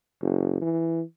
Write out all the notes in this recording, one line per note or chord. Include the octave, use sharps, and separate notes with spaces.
F#1
E3